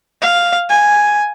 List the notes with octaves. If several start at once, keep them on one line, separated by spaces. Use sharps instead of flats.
F5
G#5